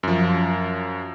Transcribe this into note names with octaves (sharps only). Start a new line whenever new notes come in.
F#2 F3